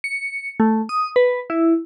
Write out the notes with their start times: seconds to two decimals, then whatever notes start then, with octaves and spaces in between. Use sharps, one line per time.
0.04 C#7
0.60 A3
0.89 D#6
1.16 B4
1.50 E4